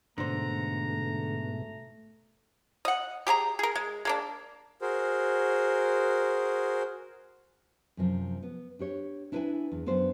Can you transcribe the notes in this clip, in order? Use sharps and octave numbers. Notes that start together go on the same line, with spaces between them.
G#2 B2 D3 A3 C5 A#5
D#5 F#5
G4 G#4 G#5 A#5
G#4 A#4
G#3
G#3 A#3 D4
F#4 G#4 A#4 C5
F#2 C3 F3
B3
D4 G4 C#5
D4 E4 B4 C#5 E5 G#5
E2
F#2 B3 D4 F4 C5